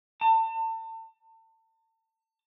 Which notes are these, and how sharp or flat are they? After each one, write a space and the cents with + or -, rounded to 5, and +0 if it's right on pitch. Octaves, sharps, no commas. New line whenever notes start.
A5 +35